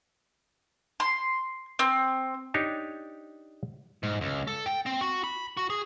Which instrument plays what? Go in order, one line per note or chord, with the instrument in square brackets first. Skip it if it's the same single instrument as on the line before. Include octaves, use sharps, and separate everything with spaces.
[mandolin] C6
C4
[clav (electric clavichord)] D4 D#4 G4 C#5
[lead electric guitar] G#2
C#2
A4
G5
C4
F#4
B5
F#4
G#4